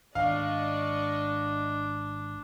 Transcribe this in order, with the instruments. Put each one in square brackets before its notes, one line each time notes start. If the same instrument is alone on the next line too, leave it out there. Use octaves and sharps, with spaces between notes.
[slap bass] G#1 [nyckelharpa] D4 [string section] D5 D#5 C#6 [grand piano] F5